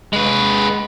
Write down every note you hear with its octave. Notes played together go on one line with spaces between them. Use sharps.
G#3 B4